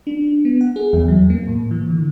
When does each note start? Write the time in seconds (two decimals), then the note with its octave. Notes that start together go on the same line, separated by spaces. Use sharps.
0.07 D4
0.45 B3
0.61 F#5
0.76 G#4
0.93 E2
1.08 F#3
1.30 A#3
1.47 A2
1.71 E3
1.90 D3